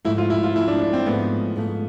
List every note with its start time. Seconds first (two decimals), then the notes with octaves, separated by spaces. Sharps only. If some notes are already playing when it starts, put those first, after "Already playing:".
0.05 G#2 F3 A3 E4
0.18 F4
0.30 E4
0.43 F4
0.55 G#2 F3 A3 E4
0.68 D4
0.81 D4
0.93 C4
1.06 G#2 F3 A3 B3
1.56 G#2 F3 A3